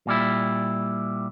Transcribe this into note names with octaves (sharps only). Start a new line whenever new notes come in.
A#2 G3 E4